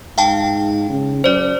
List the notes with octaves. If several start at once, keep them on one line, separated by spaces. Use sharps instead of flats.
G#2 F5 G5 A5
C#3
F#2 C5 D5